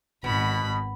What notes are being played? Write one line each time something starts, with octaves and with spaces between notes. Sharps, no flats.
G#1 B2 B5